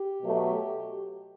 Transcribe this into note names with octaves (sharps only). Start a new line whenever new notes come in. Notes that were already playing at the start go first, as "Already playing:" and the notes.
Already playing: G4
B2 F#3 A3